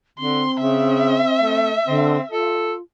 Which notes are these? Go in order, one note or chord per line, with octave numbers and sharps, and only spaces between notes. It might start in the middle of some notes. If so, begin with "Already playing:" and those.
D3 C4 C6
C#3 E5
A3
D3 C4
F4 A4